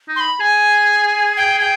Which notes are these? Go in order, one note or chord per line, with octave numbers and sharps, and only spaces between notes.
D#4
C6
B5
G#4 G#5
G5
G5